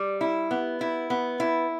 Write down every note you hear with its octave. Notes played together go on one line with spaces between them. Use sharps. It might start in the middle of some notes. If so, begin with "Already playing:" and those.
Already playing: G3
E4
B3
E4
B3
E4